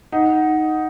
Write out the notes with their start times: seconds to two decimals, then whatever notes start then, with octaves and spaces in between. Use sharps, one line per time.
0.12 D#4 F#5